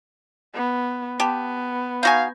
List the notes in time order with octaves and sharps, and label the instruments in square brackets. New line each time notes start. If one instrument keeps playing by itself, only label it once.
[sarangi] B3
[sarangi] B3 [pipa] G4 [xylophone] A5
[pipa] D#4 F#4 G#5 [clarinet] F5 [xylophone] G6 A#6